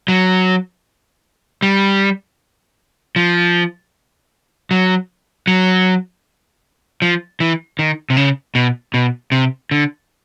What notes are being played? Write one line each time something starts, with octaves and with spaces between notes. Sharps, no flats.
F#3
G3
F3
F#3
F#3
F3
E3
D#3
C3
C#3
B2
B2
C3
D3